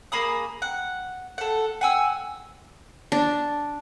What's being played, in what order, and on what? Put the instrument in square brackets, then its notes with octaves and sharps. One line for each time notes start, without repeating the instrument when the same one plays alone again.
[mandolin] A#3 G#4 B5 D#6
F#5
A4 F#5
F#5 G#5 E6
[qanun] D4